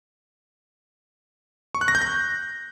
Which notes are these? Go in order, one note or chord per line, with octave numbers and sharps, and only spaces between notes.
C#6
F#6
A#6
G6
A#6